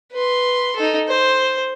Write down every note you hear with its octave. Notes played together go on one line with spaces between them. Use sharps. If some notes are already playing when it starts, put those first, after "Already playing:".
B4 C6
D#4 A4
C5